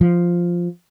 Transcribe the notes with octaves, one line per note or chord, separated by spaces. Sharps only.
F3